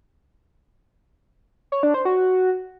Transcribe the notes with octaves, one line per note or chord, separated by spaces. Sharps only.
C#5
D4
C5
F#4